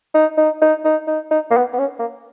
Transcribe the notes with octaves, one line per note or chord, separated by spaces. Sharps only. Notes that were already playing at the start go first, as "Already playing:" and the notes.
D#4
D#4
D#4
D#4
D#4
D#4
A#3
B3
B3
C#4
A#3